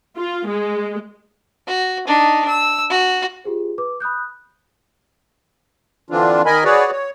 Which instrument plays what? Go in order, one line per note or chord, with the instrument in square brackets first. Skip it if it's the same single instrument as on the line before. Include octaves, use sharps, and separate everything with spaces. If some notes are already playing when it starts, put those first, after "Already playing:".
[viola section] F4
G#3
[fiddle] F#4
D4 D#4
E6
F#4
[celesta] F4 G4 G#4 C5
B4 D6
B5 D#6 F#6 G6
[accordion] D3 E3 C4 D4 F4
D#3 A#4 D#5 G#5 B5
F#4 G#4 B4 C#5 D5
C#5